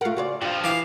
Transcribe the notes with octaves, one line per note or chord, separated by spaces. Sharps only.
A3 F4 A#4 F5 F#5
C#3 F#4 C5 D5
G2 F3 F4
E3 F5 D6